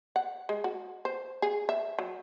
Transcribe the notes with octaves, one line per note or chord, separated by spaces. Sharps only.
F#5
G#3
F#4
C5
G#4
E5
F#3